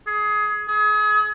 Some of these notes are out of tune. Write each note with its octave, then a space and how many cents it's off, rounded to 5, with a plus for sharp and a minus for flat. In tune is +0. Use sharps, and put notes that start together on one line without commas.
G#4 +20
G#4 +35